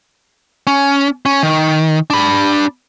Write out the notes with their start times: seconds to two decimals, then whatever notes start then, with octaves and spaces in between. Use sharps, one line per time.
0.67 C#4
1.26 C#4
1.43 D#3
2.10 D4 B5